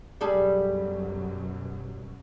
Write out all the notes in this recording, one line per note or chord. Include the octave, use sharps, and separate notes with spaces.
F#2 B2 F#3 G3 G#4 A4